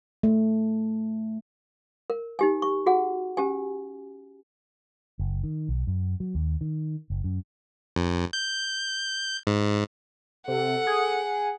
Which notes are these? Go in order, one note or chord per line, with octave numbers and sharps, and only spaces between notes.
A3
A#4
D#4 G4 G#5
C#6
F#4 G#4 F#5
C#4 G4 G#5
F#1
D#3
B1
F#2
F#3
D#2
D#3
F#1
F#2
F2
G6
G#2
C3 A4 F#5
G#4